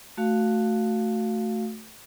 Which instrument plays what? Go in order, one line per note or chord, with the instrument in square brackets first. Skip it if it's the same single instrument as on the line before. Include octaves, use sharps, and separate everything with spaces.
[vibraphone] A3 F#4 F5